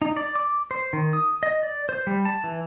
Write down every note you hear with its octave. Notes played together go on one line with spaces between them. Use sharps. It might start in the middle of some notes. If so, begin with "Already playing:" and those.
D#4
D5
D6
C5
D#3
D#6
D#5
D5
C5
G3
A5
E3